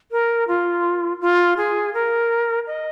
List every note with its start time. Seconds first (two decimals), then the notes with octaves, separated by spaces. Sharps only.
0.11 A#4
0.48 F4
1.21 F4
1.57 G#4
1.94 A#4
2.67 D#5